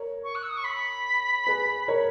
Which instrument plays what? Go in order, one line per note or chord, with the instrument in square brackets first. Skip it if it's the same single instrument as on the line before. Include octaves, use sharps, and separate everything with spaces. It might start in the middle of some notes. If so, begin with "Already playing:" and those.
Already playing: [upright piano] A#4 C#5
[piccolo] C#6
F#6
E6
D#6
C#6
B5
[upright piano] G#4 B4
A#4 C#5